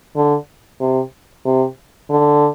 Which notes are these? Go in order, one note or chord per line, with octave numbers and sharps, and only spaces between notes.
D3
C3
C3
D3